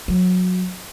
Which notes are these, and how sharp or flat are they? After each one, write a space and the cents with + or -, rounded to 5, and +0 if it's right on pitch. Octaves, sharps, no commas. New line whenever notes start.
F#3 -20